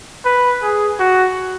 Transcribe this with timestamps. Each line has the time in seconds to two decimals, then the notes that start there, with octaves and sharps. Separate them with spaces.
0.25 B4
0.62 G#4
0.99 F#4